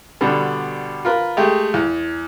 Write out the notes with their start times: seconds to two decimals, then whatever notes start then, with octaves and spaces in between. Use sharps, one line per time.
0.21 B2 D3 G3
1.05 F4 A#4 B4
1.37 G#3 A3 G4
1.74 E2